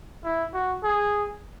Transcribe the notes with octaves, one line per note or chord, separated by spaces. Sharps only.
E4
F#4
G#4